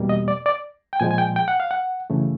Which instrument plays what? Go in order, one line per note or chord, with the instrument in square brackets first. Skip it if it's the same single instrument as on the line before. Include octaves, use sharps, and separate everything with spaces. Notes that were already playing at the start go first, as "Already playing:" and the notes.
Already playing: [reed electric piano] E2 B2 G3 A#3
D#5
D5
D5
G5
A#2 F3 G#3 G#5
G#5
G5
G5
F#5
F5
F#5
F#2 C#3 E3 A3